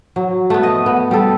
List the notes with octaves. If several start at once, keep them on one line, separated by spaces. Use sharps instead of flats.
F#3
A3 B3
D#5
B3
G3 A4